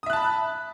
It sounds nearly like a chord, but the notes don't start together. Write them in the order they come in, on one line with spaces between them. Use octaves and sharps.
D#6 E5 F#6 A5 B5